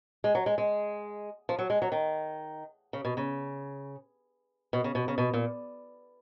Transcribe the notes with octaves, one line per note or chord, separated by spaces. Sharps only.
G#3
F#3
G#3
G#3
F3
F#3
G#3
F#3
D#3
C#3
B2
C#3
B2
C#3
B2
C#3
B2
A#2